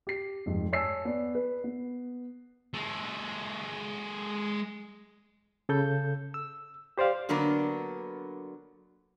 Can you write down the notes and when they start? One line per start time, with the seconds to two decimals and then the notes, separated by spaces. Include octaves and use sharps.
0.07 G4 C7
0.46 F1 F2 G#2
0.73 C#5 G#5 A5 E6 C7
1.05 B3 D5
1.35 B4
1.64 B3
2.74 G#3 A4
5.69 C#3 A4 G6
6.34 E6
6.98 G4 C5 D5 F5
7.29 D3 F#3 A#3 B3 D4 A#4